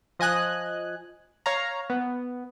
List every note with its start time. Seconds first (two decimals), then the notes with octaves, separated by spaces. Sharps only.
0.19 F3 D#5 G#5 F#6
1.46 C#5 F5 A#5
1.90 B3